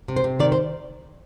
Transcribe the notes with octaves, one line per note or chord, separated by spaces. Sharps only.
C3
C5
C3
D#3 D5
C5